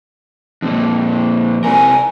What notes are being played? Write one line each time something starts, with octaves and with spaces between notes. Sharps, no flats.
F2 A#2
C3 A#4 G#5